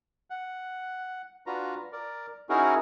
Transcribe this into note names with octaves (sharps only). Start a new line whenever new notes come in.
F#5
D4 F4 F#4 B4 A#5
A#4 D5
C#4 D#4 E4 F#4 G#4 A#4